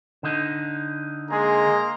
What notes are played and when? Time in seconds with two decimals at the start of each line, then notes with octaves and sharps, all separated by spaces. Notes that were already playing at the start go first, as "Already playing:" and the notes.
0.23 D3 D#4
1.31 G#3 A#3 G#4 A#5 C6